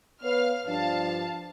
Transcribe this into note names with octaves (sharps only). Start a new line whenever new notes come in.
B3 B4 C#5 F5 F6
G2 F3 D4 F5 A5